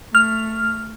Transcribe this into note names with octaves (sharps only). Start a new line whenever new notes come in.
A3 F6